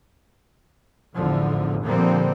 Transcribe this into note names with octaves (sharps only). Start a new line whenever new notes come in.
A1 E2 D3 F3
A#2 D3 F3 G3 A#3 C4